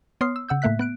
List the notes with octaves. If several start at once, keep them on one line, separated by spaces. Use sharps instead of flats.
B3 C#5 C6 D#6 F6 C7
E6
C#3 F#5 E6 G6
A2 A3 A#3 E5 F#6 B6
B3 F#6 D7